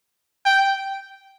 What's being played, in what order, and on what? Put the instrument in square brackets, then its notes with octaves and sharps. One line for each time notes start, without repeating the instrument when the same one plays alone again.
[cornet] G5